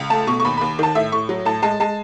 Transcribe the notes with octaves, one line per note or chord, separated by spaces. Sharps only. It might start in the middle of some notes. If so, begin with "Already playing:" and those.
Already playing: C#2
A3 A5
B2 C#6
C#6
D#2 B5
D#2 B5
D#3 A5
A2 E5
A2 C#6
F#3
A2 A5
G#3 A5
G#3 A5